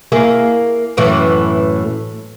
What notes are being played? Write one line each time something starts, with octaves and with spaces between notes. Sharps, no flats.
A#3 E4 G#4
F#2 A2 E3